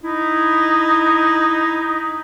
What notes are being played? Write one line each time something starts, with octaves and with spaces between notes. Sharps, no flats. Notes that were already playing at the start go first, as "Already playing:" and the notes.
D#4 E4